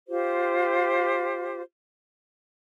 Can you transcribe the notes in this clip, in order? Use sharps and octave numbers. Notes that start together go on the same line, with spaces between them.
F4 G4 C5